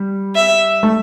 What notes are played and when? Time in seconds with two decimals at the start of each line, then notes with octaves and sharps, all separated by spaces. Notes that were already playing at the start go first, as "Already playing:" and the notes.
Already playing: G3
0.36 E5
0.83 A3